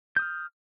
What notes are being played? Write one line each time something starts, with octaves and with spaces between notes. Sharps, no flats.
D#6 F6 G6